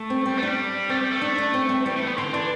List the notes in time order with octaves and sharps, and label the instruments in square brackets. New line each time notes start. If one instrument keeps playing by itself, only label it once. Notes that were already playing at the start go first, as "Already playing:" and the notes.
Already playing: [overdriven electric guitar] A3
[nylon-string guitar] C4
[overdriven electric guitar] G3 [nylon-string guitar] C4
[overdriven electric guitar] A3
[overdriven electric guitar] G3 [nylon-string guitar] D4
[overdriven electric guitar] A3 [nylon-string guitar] C4
[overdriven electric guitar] G3
A3
[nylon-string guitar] D4
D4
C4
C4
[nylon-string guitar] E3 [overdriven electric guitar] G3
[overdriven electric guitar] A3
B3
[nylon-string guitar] D3 [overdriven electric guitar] C4
[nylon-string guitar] E3 [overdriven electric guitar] D4